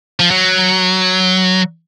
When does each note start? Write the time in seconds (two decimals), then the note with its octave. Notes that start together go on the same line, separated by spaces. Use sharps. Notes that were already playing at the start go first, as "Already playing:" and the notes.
0.20 F3
0.31 F#3